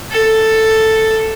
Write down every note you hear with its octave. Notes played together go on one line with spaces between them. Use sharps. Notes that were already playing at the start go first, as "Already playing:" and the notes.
A4